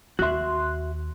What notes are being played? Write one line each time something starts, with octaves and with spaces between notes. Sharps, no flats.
D#2 F#4 E5 C6 F#6